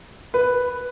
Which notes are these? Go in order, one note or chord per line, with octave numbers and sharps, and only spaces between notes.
B4